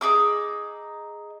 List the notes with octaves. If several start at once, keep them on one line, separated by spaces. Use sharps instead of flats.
D#4 G#4 D6 E6